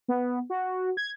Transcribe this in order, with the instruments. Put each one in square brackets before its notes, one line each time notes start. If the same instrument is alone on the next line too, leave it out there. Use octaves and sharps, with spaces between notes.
[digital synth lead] B3
F#4
G#6